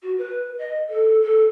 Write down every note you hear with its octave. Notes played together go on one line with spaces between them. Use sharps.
F#4
B4
D#5
A4
A4